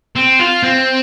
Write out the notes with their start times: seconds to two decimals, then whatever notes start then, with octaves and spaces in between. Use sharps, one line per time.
0.16 C4
0.39 F4
0.63 C4